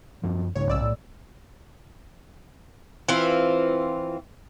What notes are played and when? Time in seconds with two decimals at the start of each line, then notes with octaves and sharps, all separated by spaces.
0.24 F#2 F3
0.55 C2 G#2 C#3 C#5
0.68 B1 D5 E6
0.81 A2
3.08 E3 C4 F4